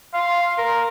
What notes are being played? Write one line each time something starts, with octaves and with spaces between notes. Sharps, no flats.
F5 C6
A#4